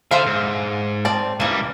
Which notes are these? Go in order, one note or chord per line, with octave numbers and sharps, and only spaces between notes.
D3 C5 E5 F5
G#2
C4 D5 A5
C#2 E3 G3 A#3